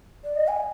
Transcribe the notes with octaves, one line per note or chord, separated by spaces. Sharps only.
D5
D#5
G#5